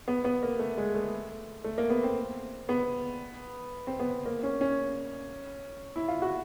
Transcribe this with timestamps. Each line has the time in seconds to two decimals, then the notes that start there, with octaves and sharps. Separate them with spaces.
0.08 B3
0.24 B3
0.43 A#3
0.59 A3
0.77 G#3
0.94 A3
1.64 A3
1.78 A#3
1.90 B3
2.03 C4
2.69 B3
3.87 C4
4.00 B3
4.26 A#3
4.43 C#4
4.61 C#4
5.96 E4
6.08 F4
6.22 F#4